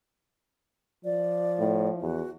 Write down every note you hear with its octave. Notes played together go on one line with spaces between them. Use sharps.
F3 D5
A2
E2 F#4